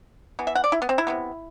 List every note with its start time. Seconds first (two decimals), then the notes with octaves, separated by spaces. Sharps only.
0.39 E3 B3
0.47 E5
0.55 F#5
0.64 D5
0.72 E4
0.82 B3
0.89 C4
0.98 E4
1.07 C3 G3 B3